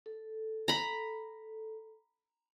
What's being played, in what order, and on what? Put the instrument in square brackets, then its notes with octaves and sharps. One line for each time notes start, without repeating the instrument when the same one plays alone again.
[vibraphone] A4
[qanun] A#5 B5